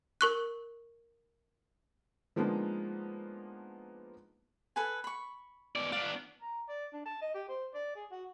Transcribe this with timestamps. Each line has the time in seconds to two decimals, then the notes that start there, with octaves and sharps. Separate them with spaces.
0.21 A#4 C#6 F#6
2.36 F3 G#3 A#3 B3 D4 D#4
4.76 A4 B4 G#5
5.04 B5 C#6
5.76 B2 D5
5.92 B3 D4 F5
6.42 A#5
6.68 D5
6.93 D4
7.06 A5
7.21 D#5
7.34 G4
7.49 C5
7.74 D5
7.96 G#4
8.11 F#4